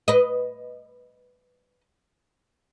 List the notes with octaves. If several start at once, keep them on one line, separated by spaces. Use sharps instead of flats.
B4 D#5